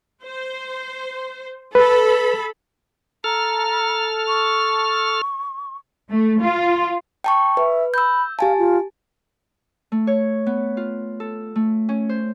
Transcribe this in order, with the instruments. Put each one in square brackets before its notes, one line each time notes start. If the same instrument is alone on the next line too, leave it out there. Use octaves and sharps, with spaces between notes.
[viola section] C5
[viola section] A4 B5 [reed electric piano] B4
[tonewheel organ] A4 F6 [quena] A#5
[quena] C#6
[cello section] A3
F4
[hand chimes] G5 A5 C#6
[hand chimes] B4 [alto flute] E5
[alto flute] B5 [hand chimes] E6 G6
[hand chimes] G4 G#5 A5 [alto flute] F5
[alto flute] F4
[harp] A3
C#5
B3
F4
A4
A3
C#4
C5